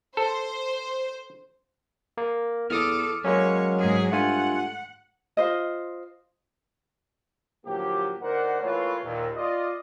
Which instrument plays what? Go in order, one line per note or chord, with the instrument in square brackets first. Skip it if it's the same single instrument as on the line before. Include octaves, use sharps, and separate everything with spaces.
[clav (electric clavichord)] A4 [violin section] C5
[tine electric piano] A#3
[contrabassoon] E2 [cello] A4 [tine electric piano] D6 D#6 F6
[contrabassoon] F#3 [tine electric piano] G#3 A#3 C#4 [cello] C#5
[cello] G#2 G#4
[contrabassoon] G2 [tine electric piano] A3 F4 G#5 [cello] F#5
[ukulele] F4 C5 D#5
[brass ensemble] A2 D3 F3 F#3 A#3 G4
D2 D#4 A#4 C5 D5 F#5
E3 A3 A#3 F4 B4 C#5
D#2 A#2
F4 D5 D#5